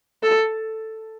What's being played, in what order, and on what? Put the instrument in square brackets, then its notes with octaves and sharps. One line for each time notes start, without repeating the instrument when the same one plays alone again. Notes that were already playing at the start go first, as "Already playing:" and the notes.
[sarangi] A4